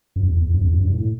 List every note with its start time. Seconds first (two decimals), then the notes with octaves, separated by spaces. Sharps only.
0.16 F#2
0.28 E2
0.42 E2
0.54 F#2
0.64 E2
0.73 F#2
0.83 G2
0.93 A2